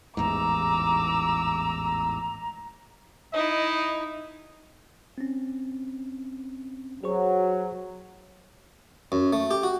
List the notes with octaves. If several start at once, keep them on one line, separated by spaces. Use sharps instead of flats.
A1 E2 G#2 A#5 D6 E6
D#4 E4 D#5
C4 C#4
F#3 G#4 C5 C#6
F#2
A3
G4
F#4